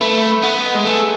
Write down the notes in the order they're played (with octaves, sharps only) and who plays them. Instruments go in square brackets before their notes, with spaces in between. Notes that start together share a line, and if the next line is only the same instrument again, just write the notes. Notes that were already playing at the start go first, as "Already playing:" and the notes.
[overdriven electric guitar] A3 [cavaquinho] B4
[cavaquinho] B4
[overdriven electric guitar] B3 [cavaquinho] F#5
[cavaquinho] D#5
[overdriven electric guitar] G#3
[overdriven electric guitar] A3 [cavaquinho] G#4